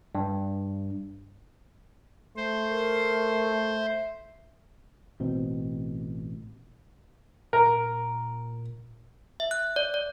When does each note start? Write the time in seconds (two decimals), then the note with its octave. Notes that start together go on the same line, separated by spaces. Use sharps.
0.15 G2
2.36 A3 C5
2.70 A#4
3.75 E5
5.20 A1 B2 C4
7.53 A#2 A#4
9.40 E5
9.51 F#6
9.76 D5
9.94 D5